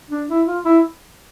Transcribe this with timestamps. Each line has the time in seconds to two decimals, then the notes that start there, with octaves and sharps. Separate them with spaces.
0.10 D4
0.29 E4
0.47 F4
0.65 E4